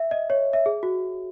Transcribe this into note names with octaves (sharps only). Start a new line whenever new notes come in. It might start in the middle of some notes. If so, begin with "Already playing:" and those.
Already playing: E5
D#5
C#5
E5
G#4
F#4